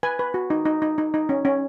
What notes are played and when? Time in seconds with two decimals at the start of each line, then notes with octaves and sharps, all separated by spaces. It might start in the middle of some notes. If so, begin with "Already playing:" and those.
0.03 B4 G#5
0.19 B4
0.34 F#4
0.50 D#4
0.65 D#4
0.82 D#4
0.98 D#4
1.14 D#4
1.29 C#4
1.45 C#4